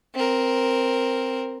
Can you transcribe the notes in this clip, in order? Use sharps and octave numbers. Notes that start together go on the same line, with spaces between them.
C4 A#4